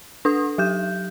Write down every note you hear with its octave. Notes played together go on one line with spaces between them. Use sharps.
D4 A4 D#6
F#3 G4 G6